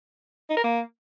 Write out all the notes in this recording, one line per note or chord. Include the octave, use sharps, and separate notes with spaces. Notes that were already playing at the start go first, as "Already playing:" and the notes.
D#4
A#4
A#3